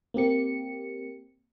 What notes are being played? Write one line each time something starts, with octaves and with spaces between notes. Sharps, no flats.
A#3 C4 G4 C#7